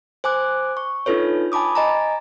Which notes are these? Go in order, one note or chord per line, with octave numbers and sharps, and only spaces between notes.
C5 G#5 D6 F#6
C#6
D4 D#4 F4 A4 B4 C#5
G#5 A5 B5 D6 D#6
D#5 G#5 A#5